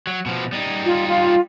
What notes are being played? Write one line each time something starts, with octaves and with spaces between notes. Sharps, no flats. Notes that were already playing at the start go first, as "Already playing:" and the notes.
F#3
B2 F3
G3 D#4
F4
F4